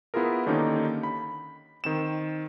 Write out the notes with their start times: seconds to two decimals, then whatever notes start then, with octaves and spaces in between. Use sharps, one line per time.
0.14 B3 E4 F4 G#4 A#4
0.46 D3 D#3 A#3 C#4 D#4 G4
1.03 B5
1.84 D#3 C4 E7